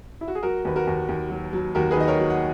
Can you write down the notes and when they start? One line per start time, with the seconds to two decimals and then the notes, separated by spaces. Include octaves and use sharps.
0.21 E4
0.28 F#4
0.35 G#4
0.43 F#3 F#4 A#4
0.65 D#2 B4
0.76 F#4 A#4
0.87 D#2
1.09 D#2
1.30 F#3
1.53 F#3
1.75 D#2 F#4 A#4
1.91 G#4 B4
1.96 D#3 D#5
2.08 A#4 C#5
2.18 F#3
2.30 F#5